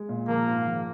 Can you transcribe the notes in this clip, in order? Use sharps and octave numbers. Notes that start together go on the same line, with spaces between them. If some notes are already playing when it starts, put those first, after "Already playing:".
Already playing: G#3
A#2
F3 A#3
G#2
F3